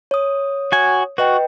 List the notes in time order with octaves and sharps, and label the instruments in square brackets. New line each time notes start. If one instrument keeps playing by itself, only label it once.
[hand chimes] C#5 D#6
[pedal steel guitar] F#4 G#5
[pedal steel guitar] F#4 [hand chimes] B4 D#5 G5